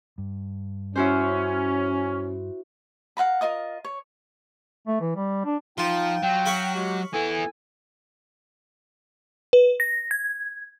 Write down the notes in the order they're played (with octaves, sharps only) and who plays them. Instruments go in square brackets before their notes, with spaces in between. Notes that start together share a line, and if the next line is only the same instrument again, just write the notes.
[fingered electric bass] G2
[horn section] C#4 [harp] E4 F#4 C5
[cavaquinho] F5 F#5 A#5 B5
F4 A#4 D#5 D#6
C#5
[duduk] A3
E3
G3
D4
[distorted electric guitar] F3 [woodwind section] D#4 G5 [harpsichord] F4
[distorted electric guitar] F#3 [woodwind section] G5
[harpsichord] F5 B5 C#6
[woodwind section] G#3 F#4 G4
[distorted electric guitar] B3 E4 [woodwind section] A4 G#5
[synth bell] B4
A#6
G#6